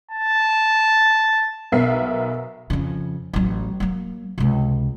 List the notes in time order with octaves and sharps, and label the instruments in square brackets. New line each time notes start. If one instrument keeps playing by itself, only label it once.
[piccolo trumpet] A5
[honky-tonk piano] B1 B3 A#4 E5 C7
[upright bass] F2 C#3
A1 F#3
F#3 A#3
C#2 C3